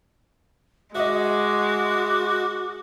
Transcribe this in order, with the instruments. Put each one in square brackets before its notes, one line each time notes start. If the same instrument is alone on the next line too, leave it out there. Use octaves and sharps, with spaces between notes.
[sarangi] G#3 [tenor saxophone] F#4 [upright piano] D#5 E5 [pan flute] D6